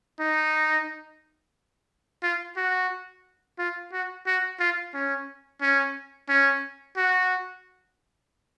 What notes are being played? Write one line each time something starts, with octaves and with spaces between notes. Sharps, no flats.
D#4
F4
F#4
F4
F#4
F#4
F4
C#4
C#4
C#4
F#4